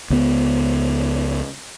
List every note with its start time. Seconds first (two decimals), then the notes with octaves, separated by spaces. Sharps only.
0.10 C#2 B3